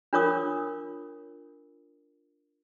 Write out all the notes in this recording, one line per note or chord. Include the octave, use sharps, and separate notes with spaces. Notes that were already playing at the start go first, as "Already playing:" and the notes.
D4 F4 A#4 C#5 D6 D#6